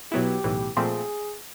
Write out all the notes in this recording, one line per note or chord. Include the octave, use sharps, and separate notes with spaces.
B2 F#3 B3 E4 G4
B1 A2 E3
A#2 F3 A3 C4 G#4